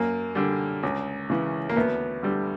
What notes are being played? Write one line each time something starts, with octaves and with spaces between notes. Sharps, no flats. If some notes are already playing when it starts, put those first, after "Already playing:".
Already playing: F#2 A#3
D3 G3
C#2
C#3 E3
A#3
D2 B3
D3 G3